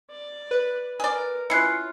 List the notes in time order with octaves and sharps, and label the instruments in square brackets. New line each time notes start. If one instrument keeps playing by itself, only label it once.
[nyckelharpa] D5
[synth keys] B4
[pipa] G#4 D5 [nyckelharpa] A#4
[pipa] C#4 E4 [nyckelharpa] F4 [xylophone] F#6 C7 C#7